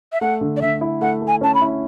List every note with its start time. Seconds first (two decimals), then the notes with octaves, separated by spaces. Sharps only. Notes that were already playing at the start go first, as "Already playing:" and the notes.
0.13 E5
0.21 A3 F#5
0.41 D3
0.57 D5
0.62 D3 E5
0.81 E4
1.01 A3 F#5
1.22 A3
1.28 G#5
1.41 C#4 A5
1.55 B5
1.62 E4